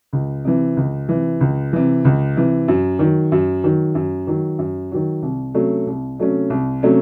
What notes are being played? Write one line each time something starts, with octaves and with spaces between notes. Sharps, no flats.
C#2
C3 E3
C#2
C3 E3
C#2
C3 E3
C#2
C3 E3
F#2
D#3 F#3
F#2
D#3 F#3
F#2
D#3 F#3
F#2
D#3 F#3
C2
C3 F#3 A3 C#4
C2
C3 F#3 A3 C#4
C2
C3 F#3 A3 C#4